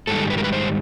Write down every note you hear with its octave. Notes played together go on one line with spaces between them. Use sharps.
G#2 D#3 G3 A4
B4
A#4
B4
C5